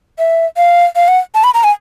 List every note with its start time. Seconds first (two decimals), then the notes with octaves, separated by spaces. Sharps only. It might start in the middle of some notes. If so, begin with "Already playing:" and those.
0.19 E5
0.57 F5
0.96 F5
1.08 F#5
1.35 A5
1.44 B5
1.54 A#5
1.64 G#5